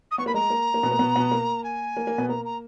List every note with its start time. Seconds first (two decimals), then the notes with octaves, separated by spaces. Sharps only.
0.11 D#6
0.18 B3 C#6
0.26 A#3 B5
0.34 G#3 A#5
0.50 A#3
0.74 A#3
0.83 B2 B3
0.91 A#3
0.99 B2 B3
1.16 B2 B3
1.31 A#3
1.64 G#5
1.97 A#3
2.07 A#3
2.18 B2 B3
2.28 A#3 A#5
2.45 A#5